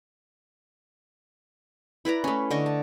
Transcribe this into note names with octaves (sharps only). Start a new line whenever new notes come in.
E4 B4 D5 A#5
A3 C#4
D3 D#5 C#6
A5